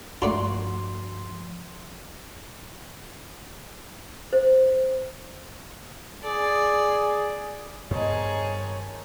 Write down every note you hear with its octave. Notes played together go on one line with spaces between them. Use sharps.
G2 F3 A3 D4 F4 F#4 C6
C5
G#4 D5
G2 D#3 B3 D#4 G#4 C5 C#5 A5